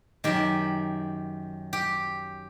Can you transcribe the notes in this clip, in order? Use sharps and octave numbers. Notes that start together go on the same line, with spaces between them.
F#2 D#3 G4
G4